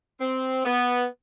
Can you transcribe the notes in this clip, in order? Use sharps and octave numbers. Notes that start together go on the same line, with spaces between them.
C4
B3